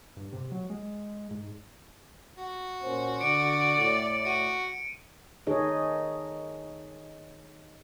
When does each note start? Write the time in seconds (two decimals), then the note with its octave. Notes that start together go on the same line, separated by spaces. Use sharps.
0.17 G2
0.33 C3
0.51 F#3
0.70 G#3
1.31 G#2
2.38 F#4
2.82 A#2 C#4 C5
3.21 D3 D5 C#7 D7
3.77 A2 D7
4.25 F#4 C#7 D#7
5.47 D#3 D#4 G#4 A4 C#5 D#5